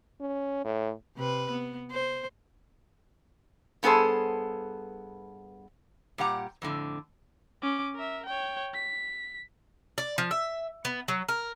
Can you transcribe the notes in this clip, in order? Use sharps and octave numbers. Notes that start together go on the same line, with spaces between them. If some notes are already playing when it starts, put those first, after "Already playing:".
C#4
A2
C3 B4
B3
C5
G2 B3 G#4 A4 C5
A#2 G3 G4 F#5 A#5
F2 A2 D3
C#4 D6
A#4 E5
C#5 G5
B6
D5
F3
E5
B3
F#3
A#4